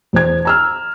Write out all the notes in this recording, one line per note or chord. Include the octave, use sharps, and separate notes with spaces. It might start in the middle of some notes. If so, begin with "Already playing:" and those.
E2 C5 G#6
A#5 E6 F6